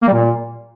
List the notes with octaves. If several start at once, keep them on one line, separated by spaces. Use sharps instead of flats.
A#3
G3
A#2